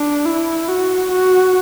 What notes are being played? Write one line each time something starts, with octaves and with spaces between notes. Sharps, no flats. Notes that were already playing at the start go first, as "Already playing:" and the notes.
Already playing: D4
E4
F#4
F#4